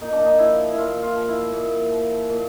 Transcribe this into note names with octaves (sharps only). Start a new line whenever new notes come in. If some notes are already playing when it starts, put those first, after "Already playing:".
A#2 D#4
D4
D#4
F3 E4
A#2 E4 F4
F4
F3
E4
A#2
F3
A#2